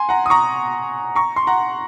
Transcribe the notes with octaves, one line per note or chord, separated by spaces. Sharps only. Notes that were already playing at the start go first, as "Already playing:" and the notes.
Already playing: G#5 C6
F#5 A#5
D#6
A#5 C#6
A#5 C#6
C6
F#5 A#5